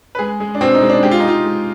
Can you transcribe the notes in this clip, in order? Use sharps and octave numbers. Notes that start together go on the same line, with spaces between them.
B4
G#3 G#4
G#3
D4
B2 C4
D#4
G#3
D4
G#3 G4
F4
D#4
G#3 F4
G#3